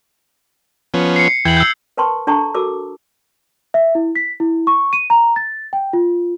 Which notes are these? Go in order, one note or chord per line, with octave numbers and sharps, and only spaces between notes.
F3 B3 C#4
C7 C#7
E2 E3 G5 G#6 F#7
E6 G6
A#4 B4 G5 A5 C6 C#6
D4 A4 G5 A5 A#5 C#6
F#4 A4 A#4 D6 E6
E5
E4
B6
E4
C#6
D#7
A#5
A6
G5
F4